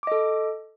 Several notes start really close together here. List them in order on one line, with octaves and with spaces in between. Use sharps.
D6 D#5 A4